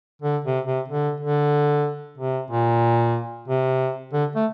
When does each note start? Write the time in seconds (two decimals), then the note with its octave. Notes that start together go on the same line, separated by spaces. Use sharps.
0.22 D3
0.45 C3
0.66 C3
0.89 D3
1.21 D3
2.18 C3
2.51 A#2
3.48 C3
4.13 D3
4.36 A3